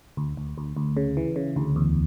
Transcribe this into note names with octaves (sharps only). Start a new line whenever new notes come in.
D2
D2
D2
D2
C#3
E3
C#3
D2
E2